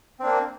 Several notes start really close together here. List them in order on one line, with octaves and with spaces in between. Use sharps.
C4 D4 A#3